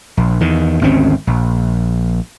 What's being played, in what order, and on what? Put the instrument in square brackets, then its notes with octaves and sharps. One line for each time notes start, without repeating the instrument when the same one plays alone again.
[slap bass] A#1
E2 D#3
G#1 D2 C4 C#4
A#1